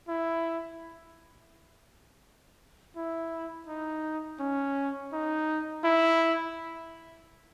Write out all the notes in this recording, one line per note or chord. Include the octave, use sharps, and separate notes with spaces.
E4
E4
D#4
C#4
D#4
E4